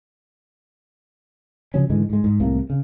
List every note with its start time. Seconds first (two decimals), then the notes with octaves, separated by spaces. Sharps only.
1.74 C#3 F3 F#3 C#4
1.90 G#2 D3 E3 G#3
2.10 G#2 G#3
2.24 G#2
2.40 C2 A2 C3 A#3
2.70 C#3